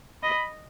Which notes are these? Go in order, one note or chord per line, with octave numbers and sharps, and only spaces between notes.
D#5 B5